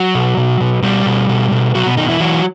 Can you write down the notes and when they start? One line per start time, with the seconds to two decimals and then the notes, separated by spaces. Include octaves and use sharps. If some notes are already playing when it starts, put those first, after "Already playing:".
Already playing: F#3 F#4
0.15 B2
0.37 B2
0.61 B2
0.82 B2 G3 G4
1.06 B2
1.29 B2
1.51 B2
1.75 B2 F#3 F#4
1.86 B2 B3
1.97 B2 D#3 D#4
2.09 E3 E4
2.20 E3 F#3 F#4